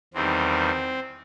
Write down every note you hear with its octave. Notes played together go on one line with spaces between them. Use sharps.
E2 D#3 G3 C4